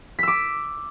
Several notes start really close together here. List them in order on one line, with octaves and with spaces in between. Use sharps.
B6 E6 D6